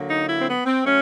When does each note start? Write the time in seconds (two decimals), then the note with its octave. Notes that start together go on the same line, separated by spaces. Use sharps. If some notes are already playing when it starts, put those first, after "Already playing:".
Already playing: D3 F#3 A#3
0.09 D#4
0.27 E4
0.38 C4
0.46 B3
0.65 C4
0.84 F#3 A3 C#4